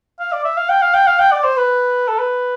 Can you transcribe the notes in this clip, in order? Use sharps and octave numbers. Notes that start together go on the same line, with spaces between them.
F5
D5
E5
F5
G5
F5
G5
F5
G5
D5
C5
B4
A4
B4